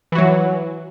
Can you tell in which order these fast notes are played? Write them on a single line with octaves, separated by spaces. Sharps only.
E3 F#4 F#3